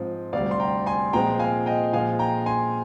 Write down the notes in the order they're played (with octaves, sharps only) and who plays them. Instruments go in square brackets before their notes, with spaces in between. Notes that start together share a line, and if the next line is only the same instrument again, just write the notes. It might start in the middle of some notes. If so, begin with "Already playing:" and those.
Already playing: [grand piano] G#2 F3 C4
D2 C3 G3 D5 F5
C6
G5 A#5
G#5 C6
A#2 F3 G#3 C4 G5 A#5
F5 G#5
D#5 G5
A#2 F3 G#3 F5 G#5
G5 A#5
G#5 C6